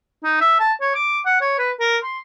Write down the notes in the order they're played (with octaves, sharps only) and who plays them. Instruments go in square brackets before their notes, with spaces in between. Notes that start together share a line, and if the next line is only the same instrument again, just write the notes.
[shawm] D#4
E5
A5
C#5
D6
F#5
C#5
B4
A#4
C6